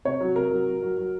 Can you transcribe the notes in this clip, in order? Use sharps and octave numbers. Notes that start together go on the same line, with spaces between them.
C3 C#5
F#3
C3 A#4
F#3
F#3
F#3
F#3